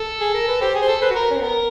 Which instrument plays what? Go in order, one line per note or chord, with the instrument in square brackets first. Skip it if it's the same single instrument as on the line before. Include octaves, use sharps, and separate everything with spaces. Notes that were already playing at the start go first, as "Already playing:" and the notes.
Already playing: [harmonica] A4
[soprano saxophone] G#4
A#4
B4
[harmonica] G4 [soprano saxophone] C5
[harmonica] G#4
[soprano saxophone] C5
[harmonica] A4
[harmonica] B4 [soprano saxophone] C5
[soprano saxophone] F#4
[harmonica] A#4
[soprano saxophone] C#4
C4
[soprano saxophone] B3 [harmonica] A#4